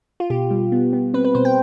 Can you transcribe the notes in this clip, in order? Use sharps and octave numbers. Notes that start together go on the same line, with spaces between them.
F4
B2 G4
G3
B3
B3
C4 B4
B4
B2 C5
G5